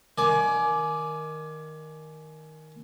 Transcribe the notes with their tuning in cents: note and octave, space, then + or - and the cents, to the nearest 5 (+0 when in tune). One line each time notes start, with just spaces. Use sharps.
D#3 +5 D5 +0 G#5 +25